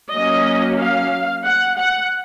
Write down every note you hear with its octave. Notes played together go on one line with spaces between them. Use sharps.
F#3 A#3 C#4 D#5
F5
F#5
F#5